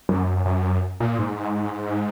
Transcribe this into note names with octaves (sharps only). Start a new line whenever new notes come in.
F#2
F#2
A#2
G#2